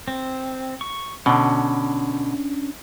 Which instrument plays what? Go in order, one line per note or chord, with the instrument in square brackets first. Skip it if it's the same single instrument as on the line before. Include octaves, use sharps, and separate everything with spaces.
[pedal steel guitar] C4
C#6
[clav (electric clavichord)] B2 D3 [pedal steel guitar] C#4 D4